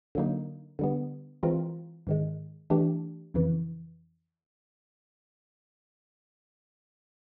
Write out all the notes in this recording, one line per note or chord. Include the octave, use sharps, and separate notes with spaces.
D3 F#3 A#3 D#4
D3 G3 B3
E3 G#3 C4 F4 A#4
G#2 D#3 G#3
E3 A3 D4 G4
F2 C#3 E3